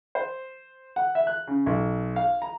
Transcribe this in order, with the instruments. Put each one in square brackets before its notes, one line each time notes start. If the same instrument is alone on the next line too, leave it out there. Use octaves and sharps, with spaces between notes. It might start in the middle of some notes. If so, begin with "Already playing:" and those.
[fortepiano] C5
F#5
E5
F#6
C#3
B1
F5
A#5